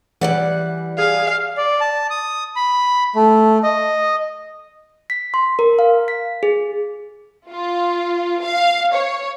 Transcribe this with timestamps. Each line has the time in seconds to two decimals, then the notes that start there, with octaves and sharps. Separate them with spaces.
0.21 E3 G3 D5 F#5
0.98 G#4 F5
1.57 D5
1.81 A5
2.10 D#6
2.56 B5
3.16 A3
3.63 D#5
5.10 B6
5.34 C6
5.59 A#4
5.79 F5
6.08 B6
6.43 G#4
7.51 F4
8.44 F5
8.94 C#5